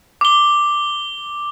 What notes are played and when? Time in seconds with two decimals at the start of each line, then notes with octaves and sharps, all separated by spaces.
0.21 D6 G7